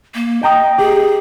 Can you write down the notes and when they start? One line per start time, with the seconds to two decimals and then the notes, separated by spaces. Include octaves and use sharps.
0.15 A#3
0.43 D#5 G5 A#5 D#6
0.78 G4 G#4